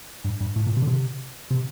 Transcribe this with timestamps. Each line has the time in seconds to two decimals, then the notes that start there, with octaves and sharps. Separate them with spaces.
0.24 G2
0.40 G2
0.56 A2
0.67 A#2
0.77 C3
0.82 D3
0.87 C3
1.51 C3